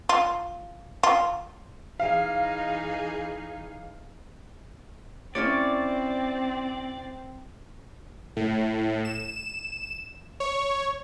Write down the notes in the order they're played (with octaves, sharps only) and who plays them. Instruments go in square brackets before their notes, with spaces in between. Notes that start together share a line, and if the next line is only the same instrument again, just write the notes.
[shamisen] F4
F4
[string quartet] E3 D#4 G#4 [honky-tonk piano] F5
[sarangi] C4 [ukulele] C#4 E4 C#5 [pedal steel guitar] D5
[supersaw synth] A2
E7
C#5